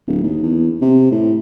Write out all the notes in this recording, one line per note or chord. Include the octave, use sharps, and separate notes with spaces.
D1
D#2
E2
C3
A2